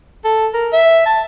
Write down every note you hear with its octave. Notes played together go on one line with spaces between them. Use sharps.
A4
A#4
E5
A5